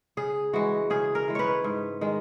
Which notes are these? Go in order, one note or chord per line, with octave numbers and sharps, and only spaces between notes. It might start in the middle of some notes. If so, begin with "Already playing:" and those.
C#3 G#4
E3 G#3 F#4
C#3 G#4
A#4
E3 G#3
B4 C#5
G#2
D#3 G#3